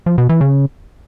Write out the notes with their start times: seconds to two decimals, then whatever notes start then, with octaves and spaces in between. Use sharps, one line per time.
0.06 F3
0.18 B2
0.29 E3
0.41 C#3